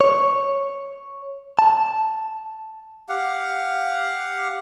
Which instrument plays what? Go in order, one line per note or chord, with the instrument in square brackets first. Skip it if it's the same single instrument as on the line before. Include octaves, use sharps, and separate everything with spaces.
[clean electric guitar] C#5
A5
[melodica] G4 F5 F#5